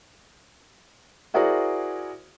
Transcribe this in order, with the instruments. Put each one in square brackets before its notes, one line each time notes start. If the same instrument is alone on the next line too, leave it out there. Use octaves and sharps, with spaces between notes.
[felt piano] E4 F#4 G#4 A#4 C5 D5